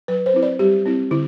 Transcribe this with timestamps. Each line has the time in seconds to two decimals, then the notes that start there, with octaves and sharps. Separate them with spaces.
0.08 F#3 B4
0.26 C5
0.34 C4 E4
0.43 D5
0.59 G3 G4
0.86 C4 E4
1.11 D3 E4